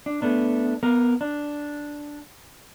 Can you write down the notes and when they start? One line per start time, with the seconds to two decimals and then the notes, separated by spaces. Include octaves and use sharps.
0.06 D4
0.22 A3 B3 D4
0.83 B3 A#4
1.21 D4